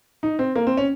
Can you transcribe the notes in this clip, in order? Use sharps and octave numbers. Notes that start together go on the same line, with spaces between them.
D#4
C4
A#3
C4
C#4